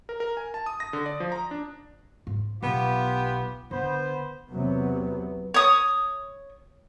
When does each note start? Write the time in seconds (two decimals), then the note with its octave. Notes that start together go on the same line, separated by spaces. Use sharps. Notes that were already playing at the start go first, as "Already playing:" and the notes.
0.09 A#4
0.20 A#4
0.37 G#5
0.54 A5
0.66 D#6
0.80 A#6
0.93 D3
1.06 D5
1.20 F3
1.32 A#5
1.51 D4
2.27 G#2
2.63 B1 B3 F4 G4
3.71 D3 B3 C5
4.50 E2 C3 F#3 B3
5.54 C#5 D#6